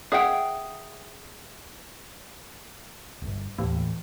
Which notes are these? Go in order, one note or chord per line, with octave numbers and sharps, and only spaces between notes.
G#4 E5 F#5 G5
D1 G1
D#2 A2 E3